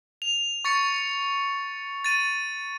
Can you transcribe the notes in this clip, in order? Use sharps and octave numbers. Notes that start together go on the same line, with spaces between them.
F7
C#6 A6 C#7
A6 D#7